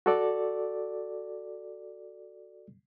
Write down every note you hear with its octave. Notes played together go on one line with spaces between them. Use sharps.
F#4 A4 D5